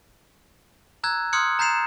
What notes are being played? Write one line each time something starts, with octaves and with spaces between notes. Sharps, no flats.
A#5 E6 F#6 G#6
C6 D#6 F6 F#6 G#6 C#7
A#5 G6 A6 C7 E7 F7